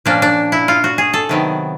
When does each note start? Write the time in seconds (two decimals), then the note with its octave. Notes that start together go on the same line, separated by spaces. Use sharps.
0.06 A#2 F3 A#3 C#4 D4
0.22 D4
0.52 E4
0.68 F4
0.84 F#4
0.98 G#4
1.13 A4
1.29 C3 D#3 F#3 B3